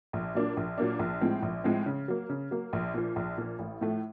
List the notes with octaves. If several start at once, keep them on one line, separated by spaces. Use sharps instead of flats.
A#1
A#2 F#3 A#3 D4
A#1
A#2 F#3 A#3 D4
A#1
A2 F3 G#3 C4
A#1
A2 F3 G#3 C4
C#3
F#3 A#3
C#3
F#3 A#3
A#1
A#2 F3
A#1
A#2 F3
A1
A2 F3 A3